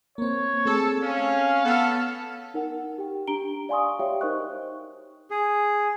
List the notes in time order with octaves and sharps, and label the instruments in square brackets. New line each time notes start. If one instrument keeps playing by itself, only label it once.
[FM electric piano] A#3 C4 [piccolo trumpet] C#5
[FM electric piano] A3 C4 G#4 [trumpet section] A4
[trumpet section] C#4 [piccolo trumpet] F5
[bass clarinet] B3 [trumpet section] A4 [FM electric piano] F#6
[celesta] D#4 A#4 F#5
G4 G5
D4 G4 A#5 D7 G7
D5 F5 G#5 C6 C#6 D#6
F#4 G4 C#5 E5 F5 G5
D#4 A#4 C5 D#5 C#6 F#6
[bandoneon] G#4